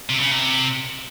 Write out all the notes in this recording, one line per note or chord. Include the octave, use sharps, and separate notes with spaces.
C3
C#3
C3